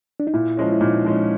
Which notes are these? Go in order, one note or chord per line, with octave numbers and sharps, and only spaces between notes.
D4
D#4
A#2 E4
F3 G#3 C#4
E4
A#2 D#4
F3 G#3 C#4